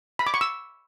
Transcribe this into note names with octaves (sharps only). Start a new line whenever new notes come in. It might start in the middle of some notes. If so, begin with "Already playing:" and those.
B5
D6
C#6
E6